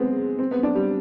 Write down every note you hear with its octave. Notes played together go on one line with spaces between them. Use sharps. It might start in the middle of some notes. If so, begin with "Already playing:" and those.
Already playing: G#3 B3 C4
C4
B3
D4
G3